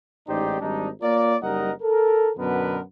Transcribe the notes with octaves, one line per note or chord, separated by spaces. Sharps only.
A1 G#2 D#4 G4 C5 D5
G#1 G3 D4 D#4
A#3 F4 A#4 C#5 D5
F#1 G3 D#4 A#4 D#5 F#5
A4 A#4
F#2 B2 D3 B3 A#4 B4